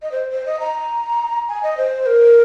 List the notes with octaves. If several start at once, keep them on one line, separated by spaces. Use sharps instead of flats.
D#5
C5
C5
D#5
A#5
G#5
D#5
C5
A#4